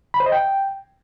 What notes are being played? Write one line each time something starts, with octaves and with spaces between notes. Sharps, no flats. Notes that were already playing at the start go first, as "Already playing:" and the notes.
B5
C5
D#5
G5